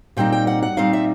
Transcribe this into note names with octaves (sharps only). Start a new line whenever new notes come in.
A#2 G3 C4 D#4 G5
G5
F#5
F#5
A#2 G3 C4 D#4 F5
E5